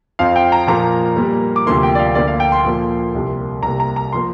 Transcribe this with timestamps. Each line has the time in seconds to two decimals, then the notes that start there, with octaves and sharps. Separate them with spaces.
0.19 F2 F3 C4 F5
0.36 G5
0.52 A#5
0.67 A#2 F3 A#3 A#5
1.17 A#2 G3 A#3
1.56 D6
1.67 D2 C3 F3 A#3 C6
1.83 G5
1.95 D5
1.99 F5
2.15 D2 D3 A#3 D5
2.27 F5
2.40 G5
2.52 C6
2.64 A#2 F3 A#3
3.15 C2 C3 A#3
3.63 C2 C3 A#3 A#5
3.80 A#5
3.96 A#5
4.12 F3 A#3 C6